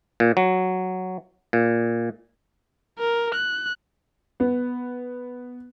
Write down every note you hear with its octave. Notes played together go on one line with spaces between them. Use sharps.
A#2
F#3
A#2
A#4
F#6
B3